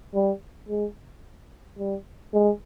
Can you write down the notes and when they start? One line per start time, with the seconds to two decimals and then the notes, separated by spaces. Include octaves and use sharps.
0.15 G3
0.68 G#3
1.78 G3
2.33 G#3